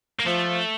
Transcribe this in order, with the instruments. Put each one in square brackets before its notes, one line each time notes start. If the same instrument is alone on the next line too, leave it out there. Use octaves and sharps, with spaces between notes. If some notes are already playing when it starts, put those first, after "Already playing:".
[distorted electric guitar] A#3
[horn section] F3 [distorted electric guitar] A3